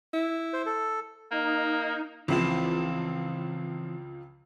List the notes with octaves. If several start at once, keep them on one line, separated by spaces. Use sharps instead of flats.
E4
C5
A4
A#3 D#4
C#2 E3 F3 C4 E4